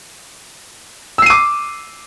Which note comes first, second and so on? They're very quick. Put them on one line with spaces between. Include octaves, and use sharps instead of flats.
E6 C7 D#7 D6